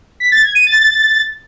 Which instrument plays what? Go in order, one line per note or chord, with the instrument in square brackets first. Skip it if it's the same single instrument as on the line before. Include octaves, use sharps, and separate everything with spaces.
[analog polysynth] B6
A6
G#6
D#7
A6